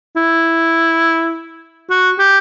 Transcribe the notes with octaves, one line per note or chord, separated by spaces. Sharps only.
E4
F#4
G4